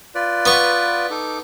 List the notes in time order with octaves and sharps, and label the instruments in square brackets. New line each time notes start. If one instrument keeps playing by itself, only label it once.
[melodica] F4 B4 D5
[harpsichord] B3 C#6
[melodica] D#4 A4 D6